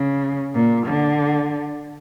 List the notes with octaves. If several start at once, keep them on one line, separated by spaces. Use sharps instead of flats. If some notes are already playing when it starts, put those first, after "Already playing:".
Already playing: C#3
A#2
D3